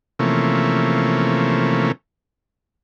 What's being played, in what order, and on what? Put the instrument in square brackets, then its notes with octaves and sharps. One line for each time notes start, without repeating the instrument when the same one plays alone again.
[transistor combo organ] C3 E3 F3 A3 A#3 C#4